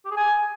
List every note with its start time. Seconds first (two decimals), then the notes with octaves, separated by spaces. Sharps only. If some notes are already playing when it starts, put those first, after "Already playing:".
0.06 G4
0.11 G#4
0.17 G#5